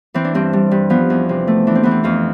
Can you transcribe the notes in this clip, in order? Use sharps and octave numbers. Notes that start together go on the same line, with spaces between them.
E3 C4
D4
G2 C4
G3
G2
F3 B3
E2
C3
A3
E3 D4
C4
E3 B3
C4
F2 F4